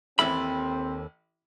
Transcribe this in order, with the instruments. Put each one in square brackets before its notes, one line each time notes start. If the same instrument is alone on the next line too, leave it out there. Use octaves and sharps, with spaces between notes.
[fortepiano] A1 E3 E5 [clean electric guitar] D#2 A4 B5 [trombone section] C4